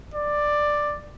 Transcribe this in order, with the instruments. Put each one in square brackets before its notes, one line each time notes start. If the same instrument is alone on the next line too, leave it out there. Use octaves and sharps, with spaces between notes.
[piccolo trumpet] D5